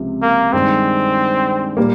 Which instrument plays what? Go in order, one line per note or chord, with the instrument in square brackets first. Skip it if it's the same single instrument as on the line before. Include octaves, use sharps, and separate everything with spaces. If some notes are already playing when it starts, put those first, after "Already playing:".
Already playing: [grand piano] C#2 C3 F3
[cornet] A#3
[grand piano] G2 D#3 G#3 [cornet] C4
[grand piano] A#2 G3 A#3